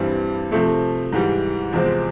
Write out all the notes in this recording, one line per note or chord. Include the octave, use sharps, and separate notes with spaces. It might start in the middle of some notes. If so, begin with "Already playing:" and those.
Already playing: G2 E3 G3 C4
C3 F3 A3 C4
G#2 E3 G3
E2 C3 F3 G#3 C4